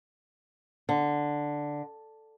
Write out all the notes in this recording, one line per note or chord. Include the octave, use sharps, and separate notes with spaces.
D3